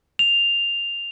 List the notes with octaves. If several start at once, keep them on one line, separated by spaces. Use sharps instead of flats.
F7